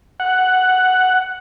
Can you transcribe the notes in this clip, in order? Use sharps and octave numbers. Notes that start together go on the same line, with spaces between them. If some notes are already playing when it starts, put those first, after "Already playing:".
F#5